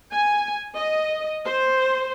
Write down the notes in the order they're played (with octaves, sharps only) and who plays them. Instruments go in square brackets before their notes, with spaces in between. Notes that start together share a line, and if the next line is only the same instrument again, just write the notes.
[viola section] G#5
D#5
C5